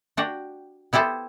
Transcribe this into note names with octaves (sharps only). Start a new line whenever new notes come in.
D4 F#4 G4
B3 E4 G4 A4 C5